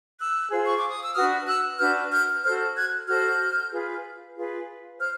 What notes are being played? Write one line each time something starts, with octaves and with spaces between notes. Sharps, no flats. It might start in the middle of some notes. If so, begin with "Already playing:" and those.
E6 F#6
F4 G#4 C5
C#6
D6
D#6
E6
D4 F#4 B4 D#6 F6
E6 F#6
D4 F#4 B4 F6 G6
F6 G6
F#4 A4 C5 F6 G6
F#6 G#6
F#4 A4 C5 F6 G6
F4 G#4 B4
F4 G#4 B4
C5 F6 G6